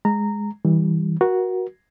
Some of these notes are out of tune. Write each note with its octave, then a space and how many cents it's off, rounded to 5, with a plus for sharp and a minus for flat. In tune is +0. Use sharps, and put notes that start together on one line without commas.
G#3 +0 A#5 -15
E3 -30 G3 +0
F#4 +0 A#4 +30